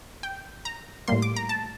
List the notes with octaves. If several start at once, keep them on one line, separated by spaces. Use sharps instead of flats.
G5
A#5
A2 G3 A#3 C6
D6
A#5
A5